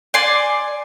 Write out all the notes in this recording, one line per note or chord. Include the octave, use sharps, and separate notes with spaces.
D5 G#5 C6